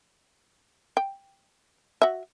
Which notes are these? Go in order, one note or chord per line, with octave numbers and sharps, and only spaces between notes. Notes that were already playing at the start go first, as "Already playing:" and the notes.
G5
F#4 E5